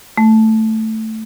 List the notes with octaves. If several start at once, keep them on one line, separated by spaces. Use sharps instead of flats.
A3